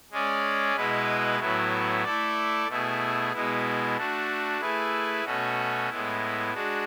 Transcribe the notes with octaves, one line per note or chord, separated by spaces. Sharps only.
G#3 C#4 G#4 D5
B2 G#3 B3 E4 B4
A2 F#3 B3 E4
A3 E4 A4 D5
B2 A3 E4 G#4
B2 G#3 B3 E4
A3 D4 F#4
A3 E4 G#4 B4
B2 A3 C#4 F#4
A2 G#3 B3 E4
G#3 D4 F#4